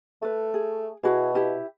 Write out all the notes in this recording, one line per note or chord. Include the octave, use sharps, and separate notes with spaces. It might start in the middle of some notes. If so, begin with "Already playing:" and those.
A3 A4 B4
G#4
B2 E4 F#4 G#4
E4 G4 B4